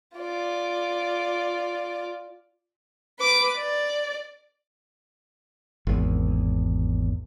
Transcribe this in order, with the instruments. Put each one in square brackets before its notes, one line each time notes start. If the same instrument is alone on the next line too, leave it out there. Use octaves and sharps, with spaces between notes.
[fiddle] F4 D5
[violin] B4 D6
D5
[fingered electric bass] G#1 E2